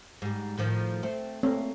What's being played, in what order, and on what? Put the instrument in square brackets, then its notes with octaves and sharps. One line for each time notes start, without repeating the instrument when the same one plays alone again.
[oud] G#2 G3
A2 D#3 F3
A3 C4
[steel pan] A3 C4 C#5 [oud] A#3